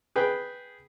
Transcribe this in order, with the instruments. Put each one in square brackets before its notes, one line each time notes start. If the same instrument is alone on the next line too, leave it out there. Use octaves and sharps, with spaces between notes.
[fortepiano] G#4 B4 G5